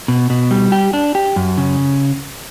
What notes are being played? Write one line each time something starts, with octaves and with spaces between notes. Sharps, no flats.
B2
B2
G3
G4
D4
G4
F#2
C#3